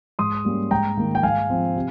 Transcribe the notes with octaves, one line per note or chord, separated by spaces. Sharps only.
G#2 C6 D#6
G3 A#3 C#4
G#2 G5 A#5
D#3 A#3
G5
G#2 F5 G#5
F3 C4
C3